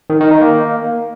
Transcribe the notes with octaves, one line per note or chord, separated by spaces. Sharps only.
D#3
D#3
D#4
A#3